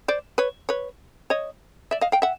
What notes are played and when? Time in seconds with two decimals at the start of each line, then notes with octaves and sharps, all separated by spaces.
0.08 C5 D5
0.38 B4 C#5
0.69 B4 C#5
1.30 C#5 D#5
1.91 D5 E5
2.01 D#5 F5
2.12 F5 G5
2.22 E5 F#5